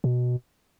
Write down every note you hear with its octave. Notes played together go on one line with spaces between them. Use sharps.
B2